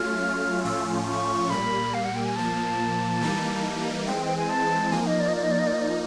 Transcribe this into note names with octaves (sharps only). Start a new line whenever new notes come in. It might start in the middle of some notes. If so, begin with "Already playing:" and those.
Already playing: F#3 A3 C#4 F4 F6
A2 F3 A3 C#4 F4 E6
C#6
A#2 G3 A#3 B5
F5
F#5
G5
G#5
A#2 F3 A#3 A5
E3 G3 A#3 D#4
E3 G#3 C4 G5
G5
G#5
A5
F3 A#3 D#4 G#5
D#5
D5
D#5
D5
D#5
D5
D#5
D5
D#5
D5
D#5